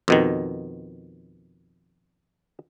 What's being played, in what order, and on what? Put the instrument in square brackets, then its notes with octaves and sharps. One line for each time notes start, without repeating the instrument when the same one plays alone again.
[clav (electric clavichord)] F2 B2 D#3